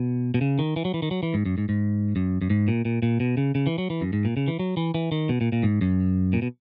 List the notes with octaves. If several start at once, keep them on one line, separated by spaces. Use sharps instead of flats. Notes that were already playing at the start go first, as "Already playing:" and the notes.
Already playing: B2
B2
C#3
D#3
E3
F#3
E3
D#3
F#3
E3
G#2
F#2
G#2
G#2
F#2
F#2
G#2
A#2
A#2
A#2
B2
C#3
C#3
E3
F#3
E3
F#2
G#2
A#2
C#3
E3
F#3
E3
E3
D#3
B2
A#2
A#2
G#2
F#2
A#2
B2